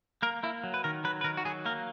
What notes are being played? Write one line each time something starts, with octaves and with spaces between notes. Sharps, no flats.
A#3 A#4
A#3 E4
F#3
B4
D#3 A#4
F#3 B4
B4
D#3 A#4
F#4
F#3 G#4
A#3 A#4